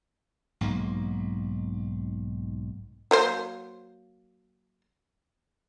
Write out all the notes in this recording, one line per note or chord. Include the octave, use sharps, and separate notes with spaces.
B1 G#2 A#3
F#3 A#3 C5